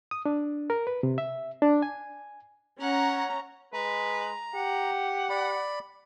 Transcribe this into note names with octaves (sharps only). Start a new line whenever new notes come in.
D#6
D4
A#4
B4
C3
E5
D4
G#5
C#4 F#5 A#5
G#3 B4 A#5
G4 F#5
D5 B5